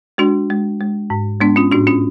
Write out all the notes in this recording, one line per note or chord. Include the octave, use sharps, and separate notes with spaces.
G#3 D4 F#4
G#3
G#3
G#2
G#3 B3 D4
C#4 F4
A2 D4 F#4
C#4 F4